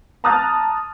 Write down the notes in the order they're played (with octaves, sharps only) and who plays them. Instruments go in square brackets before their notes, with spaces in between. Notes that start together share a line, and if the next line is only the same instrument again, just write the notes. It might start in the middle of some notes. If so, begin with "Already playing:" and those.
[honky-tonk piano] A5 A#5 D#6 F6 F#6 A6